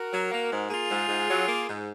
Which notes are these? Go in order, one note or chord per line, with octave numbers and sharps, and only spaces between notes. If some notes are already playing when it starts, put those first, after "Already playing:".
Already playing: F#4 A#4
F#3
A#3
G#2
A#3 F4 G#4
G#2
G#2
F#3
A#3
G#2